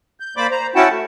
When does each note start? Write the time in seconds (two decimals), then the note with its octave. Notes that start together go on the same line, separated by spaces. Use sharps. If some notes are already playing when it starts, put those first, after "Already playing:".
0.20 G6
0.37 A#3 C5 D5 B5 D6
0.51 C5 A#5
0.75 C#4 E4 F#4 F#5 G5 A5
0.89 A3